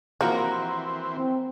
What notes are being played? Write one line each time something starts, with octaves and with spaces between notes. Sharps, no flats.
E3 F3 A#3 C4 F#4 A#4
C4